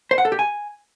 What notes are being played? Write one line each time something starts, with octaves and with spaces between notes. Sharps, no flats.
C5
F#5
A4
G4
G#5